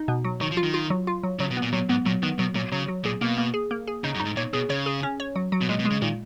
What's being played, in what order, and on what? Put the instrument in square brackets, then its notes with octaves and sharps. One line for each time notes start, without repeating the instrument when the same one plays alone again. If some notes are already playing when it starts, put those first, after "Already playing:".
Already playing: [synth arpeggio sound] D#4
B2
F#3
[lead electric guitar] D#3 [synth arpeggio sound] F#3
[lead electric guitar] F3
[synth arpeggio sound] F4
[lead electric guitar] D#3
[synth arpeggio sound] F4
F#3
F4
F#3
[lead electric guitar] C#3 [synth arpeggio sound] F#3
[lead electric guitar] B2
[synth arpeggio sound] B3
[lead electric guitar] A#2
[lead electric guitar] A#2 [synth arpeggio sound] F#3
[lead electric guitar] G#2 [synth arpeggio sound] B3
[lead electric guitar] A#2 [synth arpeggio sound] F#3
[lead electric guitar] D#3 [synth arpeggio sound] B3
[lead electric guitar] B2 [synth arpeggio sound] F#3
[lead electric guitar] A#2 [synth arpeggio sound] F#3
[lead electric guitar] C#3 [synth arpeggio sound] F#3
[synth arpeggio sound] F#3
[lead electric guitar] A#2 [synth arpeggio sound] G#4
[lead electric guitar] B2 [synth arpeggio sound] A#3
[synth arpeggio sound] A#3
G#4
A#3
G#4
[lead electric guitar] C#3 [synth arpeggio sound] D#4
[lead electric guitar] F#2
[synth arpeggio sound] D#4
[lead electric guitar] G#2
[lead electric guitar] A#2 [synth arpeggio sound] C#5
[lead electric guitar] B2 [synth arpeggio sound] G#4
[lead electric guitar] C#3 [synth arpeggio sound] C#5
[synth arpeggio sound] G#4
C#4
C#5
F#3
F#3
[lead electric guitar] B2
[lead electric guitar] A#2 [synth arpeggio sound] G#3
[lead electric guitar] B2
[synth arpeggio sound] G#3
[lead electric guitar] C#3
[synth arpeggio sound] A#2 [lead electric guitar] D#3